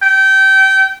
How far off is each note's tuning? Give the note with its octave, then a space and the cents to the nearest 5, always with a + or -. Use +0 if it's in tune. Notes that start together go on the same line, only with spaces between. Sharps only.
G5 -25